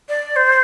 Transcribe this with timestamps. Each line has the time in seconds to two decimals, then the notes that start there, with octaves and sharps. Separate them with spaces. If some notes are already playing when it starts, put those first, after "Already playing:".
0.09 D5
0.36 C5